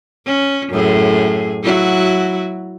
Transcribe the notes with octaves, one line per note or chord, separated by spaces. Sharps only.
C#4
F#2 A2 G#4
F#3 E4 F#4